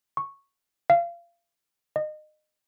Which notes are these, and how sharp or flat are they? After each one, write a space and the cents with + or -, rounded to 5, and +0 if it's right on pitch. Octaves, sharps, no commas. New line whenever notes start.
C#6 -5
F5 -25
D#5 -25